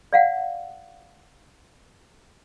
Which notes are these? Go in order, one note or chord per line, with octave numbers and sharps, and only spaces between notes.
D5 F5 F#5